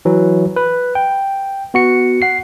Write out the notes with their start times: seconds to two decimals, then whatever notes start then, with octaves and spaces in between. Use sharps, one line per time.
0.05 E3 F#3
0.56 B4
0.95 G5
1.74 B3 F#4 C#7
2.22 F#5 C7